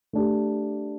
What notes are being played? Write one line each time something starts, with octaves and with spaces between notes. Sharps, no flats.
A3 D4 G4